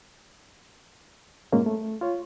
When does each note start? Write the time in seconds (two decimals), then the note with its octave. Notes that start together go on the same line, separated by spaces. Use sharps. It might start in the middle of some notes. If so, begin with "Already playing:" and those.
1.52 G2 A#2 G#3 A#3 C#4
1.66 A3
2.01 F4 C#5